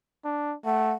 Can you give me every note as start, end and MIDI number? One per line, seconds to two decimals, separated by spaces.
0.25 0.53 62
0.65 0.95 57
0.65 0.94 78